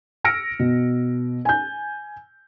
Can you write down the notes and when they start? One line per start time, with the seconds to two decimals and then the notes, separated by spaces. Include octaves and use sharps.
0.24 E6 F6 A#6 C#7 D7
0.59 B2
1.45 G#5 G6